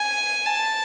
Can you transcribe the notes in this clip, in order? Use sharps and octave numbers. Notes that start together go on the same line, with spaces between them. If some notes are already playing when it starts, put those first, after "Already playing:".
Already playing: G#5
A5